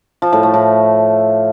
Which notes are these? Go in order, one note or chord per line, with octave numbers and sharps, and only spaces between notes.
F3
A2
A3
A2